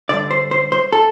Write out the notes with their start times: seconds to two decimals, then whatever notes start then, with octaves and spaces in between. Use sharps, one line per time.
0.09 G2 D3 D5
0.31 C5
0.51 C5
0.72 C5
0.92 A4